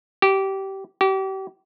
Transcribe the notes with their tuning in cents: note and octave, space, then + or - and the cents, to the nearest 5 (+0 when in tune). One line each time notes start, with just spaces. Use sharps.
G4 -20
G4 -35